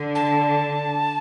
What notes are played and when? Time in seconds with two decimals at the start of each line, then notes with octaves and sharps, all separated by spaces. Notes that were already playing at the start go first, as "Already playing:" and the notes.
Already playing: D3
0.15 A5